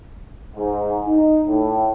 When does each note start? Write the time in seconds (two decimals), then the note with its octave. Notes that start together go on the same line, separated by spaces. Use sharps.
0.56 G#2
1.07 D#4
1.48 A2